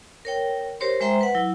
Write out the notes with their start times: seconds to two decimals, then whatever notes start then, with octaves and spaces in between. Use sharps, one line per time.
0.25 A#4 C#5 G5
0.80 G4 A#4 C5 C#5 C6
1.00 G#3 C5 E5 G5 A#5 C6
1.21 B4 F#5
1.35 F#3 E4